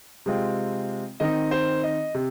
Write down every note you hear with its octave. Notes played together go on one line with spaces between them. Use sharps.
C3 G#3 C4 F4
D#3 C4 D#4 D#5
C5
D#5
C3